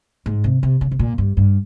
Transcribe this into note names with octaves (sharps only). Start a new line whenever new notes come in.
G#2
C3
C3
C#3
C3
A#2
G2
G2